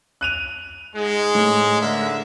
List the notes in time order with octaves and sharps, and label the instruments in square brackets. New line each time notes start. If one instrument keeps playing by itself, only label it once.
[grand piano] F#6 D#7 F7
[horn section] G#2 G#3
[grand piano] A2
[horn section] D3 A#4 E5